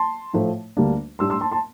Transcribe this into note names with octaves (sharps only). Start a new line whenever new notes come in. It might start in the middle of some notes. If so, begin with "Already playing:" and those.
Already playing: A5 C6
A2 F3 A3
D2 D3 G3 A#3 D4
A2 G3 D4 C6 E6
C6 E6
A5 C6
A5 C6